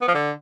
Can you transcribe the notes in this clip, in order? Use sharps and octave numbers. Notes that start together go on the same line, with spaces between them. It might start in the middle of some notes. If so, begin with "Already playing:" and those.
B3
F3
D3